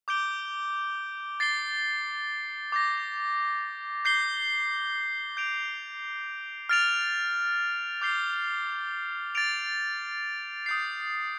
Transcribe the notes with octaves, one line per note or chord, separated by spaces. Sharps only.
D6 G6 D7 G7
A6 C7 G7
D6 G6 A#6
G6 C7 G7
G6 D7 F7
F6 A6 D7 F7
D6 G6 C7 G7
A6 D7 F7
D#6 G6 C7